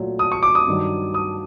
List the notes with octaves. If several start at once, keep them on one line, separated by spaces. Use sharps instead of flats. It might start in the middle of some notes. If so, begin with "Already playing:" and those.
Already playing: A#2 F#3 A3
D#6
C#6
D6
D#6
G2 D#3 F#3
D#6